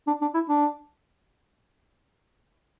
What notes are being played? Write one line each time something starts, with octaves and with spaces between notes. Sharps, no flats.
D4
D4
E4
D4